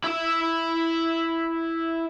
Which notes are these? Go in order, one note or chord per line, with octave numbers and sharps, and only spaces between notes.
E4 E5